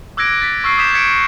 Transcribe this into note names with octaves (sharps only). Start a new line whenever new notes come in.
D6 E6 F#6 G#6 A#6 D7
A6 B6
C#6 E6 F6 C7 D7
D6 D#6 G6 B6 E7
F6 G#6 B6 C#7 D7